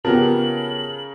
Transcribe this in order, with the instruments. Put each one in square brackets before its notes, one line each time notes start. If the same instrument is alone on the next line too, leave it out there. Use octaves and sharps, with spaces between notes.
[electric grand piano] C#3 A#4 A5 [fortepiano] F3 B3 G4 [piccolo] F#7